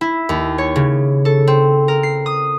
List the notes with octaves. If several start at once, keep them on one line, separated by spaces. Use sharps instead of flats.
E4
D#2
C#5
C#3
A4
C4
A#4
C7
D#6